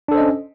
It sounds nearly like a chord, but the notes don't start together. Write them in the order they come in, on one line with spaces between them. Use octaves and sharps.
D4 A4 C5 D#5 C#4